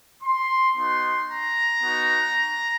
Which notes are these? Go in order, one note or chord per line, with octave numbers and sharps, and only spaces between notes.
C6
B3 D#4 F#4 C6
A#5
B3 D#4 F#4